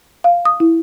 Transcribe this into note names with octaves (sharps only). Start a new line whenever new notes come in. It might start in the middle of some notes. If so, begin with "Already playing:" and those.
F5
D#6
E4